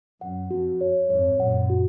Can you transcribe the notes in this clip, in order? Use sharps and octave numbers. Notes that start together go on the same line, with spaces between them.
F#2 F#5
F2 F#4
C#5
F2 G#2 C#5
F#2 A#2 F#5
F#4